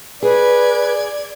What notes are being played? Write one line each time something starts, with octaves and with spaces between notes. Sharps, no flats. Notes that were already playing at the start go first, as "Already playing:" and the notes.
G#4 B4 D5 G#6